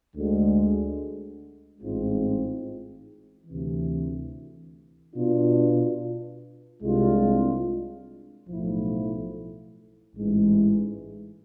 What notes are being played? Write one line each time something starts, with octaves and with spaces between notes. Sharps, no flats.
D2 D3 G#3
A1 G#2 G#3 C4 F4
D2 C3 E3
B2 B3 D4 F4
C2 C3 G#3 D4 F4
B1 A2 F3 A3 E4
A1 G#2 E3 G#3